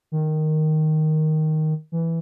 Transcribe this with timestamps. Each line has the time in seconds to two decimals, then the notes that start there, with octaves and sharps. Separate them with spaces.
0.12 D#3
1.92 E3